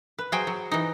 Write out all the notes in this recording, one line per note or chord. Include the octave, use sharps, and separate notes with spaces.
B4
F#3 G#4 C5 G5 G#5
F#3
E3 D#4